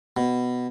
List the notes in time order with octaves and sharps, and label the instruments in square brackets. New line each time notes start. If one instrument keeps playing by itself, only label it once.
[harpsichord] B2